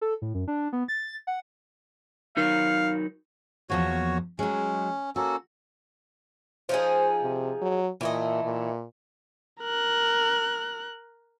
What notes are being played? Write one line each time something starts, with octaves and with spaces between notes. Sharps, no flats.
A4
A2
F#2
D4
B3
A6
F#5
F#3 D#4 A#4 F5
E2 F3 A#3 F#4 C#5
F#3 G#3 C#4
A#3 C#4 F#4 A4
F3 D#4 G#4 C5
C3
F#3
A#2 E3 A3 D#5
A#2
A#4 F#6